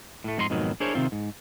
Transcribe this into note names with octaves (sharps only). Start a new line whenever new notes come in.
A2 A3
F2 G#2 D#4 G#4 C6
F2 G#2 B2 D#3 F#3
D4 E4 G#4 A#4 C5 C#5
C3 D#3 C4 F4
G#2